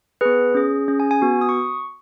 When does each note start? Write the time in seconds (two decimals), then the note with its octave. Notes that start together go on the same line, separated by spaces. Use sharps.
0.21 B3 G#4 B4
0.55 C#4 G#4
0.88 C#4 G#4
1.00 G#5
1.11 G#5
1.22 B3 F#4
1.41 D#6
1.49 C#6